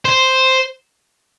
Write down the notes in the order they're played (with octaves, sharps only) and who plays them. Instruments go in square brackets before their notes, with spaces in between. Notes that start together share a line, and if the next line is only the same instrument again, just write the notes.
[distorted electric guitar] C5